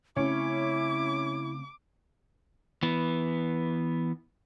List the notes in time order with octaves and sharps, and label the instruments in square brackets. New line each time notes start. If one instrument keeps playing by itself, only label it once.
[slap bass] C#3 A3 C4 [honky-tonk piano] C#4 [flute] E4 [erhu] D6
[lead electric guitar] E3 B3